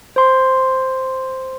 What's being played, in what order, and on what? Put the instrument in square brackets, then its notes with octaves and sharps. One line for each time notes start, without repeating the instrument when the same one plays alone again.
[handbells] C5 C6